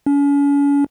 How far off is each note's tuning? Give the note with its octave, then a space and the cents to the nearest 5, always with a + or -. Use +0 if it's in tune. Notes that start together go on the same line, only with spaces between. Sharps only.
C#4 +40